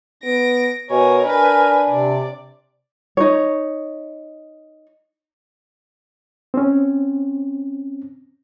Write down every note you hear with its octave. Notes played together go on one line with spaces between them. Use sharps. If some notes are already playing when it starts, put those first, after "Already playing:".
B3 A#6 D7
B2 A#4 C#5 G#5
D4 A#4 B4 G#5
C3 D5
D#4 C#5
C4 C#4